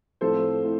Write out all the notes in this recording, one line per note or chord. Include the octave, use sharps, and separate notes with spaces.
A2 F3 A3 C4 A4 C5
A2